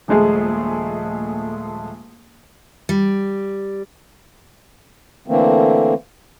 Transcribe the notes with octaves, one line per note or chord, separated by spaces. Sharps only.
D#1 A#1 G#3 A3 G#4
G3
D3 E3 A3 A#3 C4